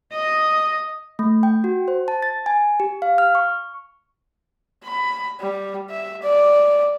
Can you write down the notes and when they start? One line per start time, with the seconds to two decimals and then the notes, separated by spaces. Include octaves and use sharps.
0.13 D#5
1.19 A3
1.43 G5
1.64 F#4
1.88 C5
2.08 A5
2.22 A6
2.46 G#5
2.80 G4
3.02 F5
3.18 F6
3.35 C#6
4.84 B5
5.41 G3
5.90 E5
6.23 D5